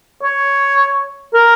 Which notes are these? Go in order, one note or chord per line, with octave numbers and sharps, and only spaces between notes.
C#5
A#4